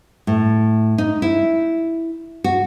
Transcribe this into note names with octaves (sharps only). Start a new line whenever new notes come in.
A2
D#4
E4
F#4